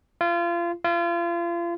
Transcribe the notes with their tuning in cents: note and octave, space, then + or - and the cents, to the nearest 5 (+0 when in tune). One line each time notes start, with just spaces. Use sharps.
F4 -30
F4 -35